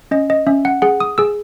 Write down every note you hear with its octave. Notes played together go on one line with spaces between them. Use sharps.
C#4 D#5
D#5
C#4 E5
F#5
G#4 F#5
D#6
G#4 E6